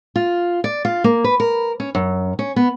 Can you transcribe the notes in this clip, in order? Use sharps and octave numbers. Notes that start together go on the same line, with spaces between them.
F4
D5
F4
A#3
B4
A#4
C#4
F#2
C#4
B3